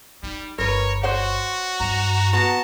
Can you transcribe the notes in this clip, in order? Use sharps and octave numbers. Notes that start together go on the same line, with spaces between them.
G3 D#4
G1 F4 A#4 B4 C#5
F#4 C5 C#5 F#5
G2 A#5
B3 F#4 A5